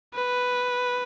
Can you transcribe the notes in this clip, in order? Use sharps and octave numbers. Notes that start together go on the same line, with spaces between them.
B4